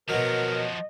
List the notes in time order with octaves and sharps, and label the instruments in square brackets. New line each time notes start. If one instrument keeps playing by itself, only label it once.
[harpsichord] B2 F#3 [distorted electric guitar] F3 F#4 [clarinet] A#4 [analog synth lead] D#5